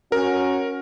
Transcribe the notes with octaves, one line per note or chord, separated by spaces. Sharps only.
C#4 F#4 A#4